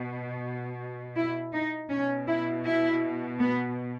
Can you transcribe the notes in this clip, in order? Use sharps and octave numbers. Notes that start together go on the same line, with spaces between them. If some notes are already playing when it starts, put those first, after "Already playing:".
Already playing: B2
E4
D#4
B2 C#4
E4
E4
B3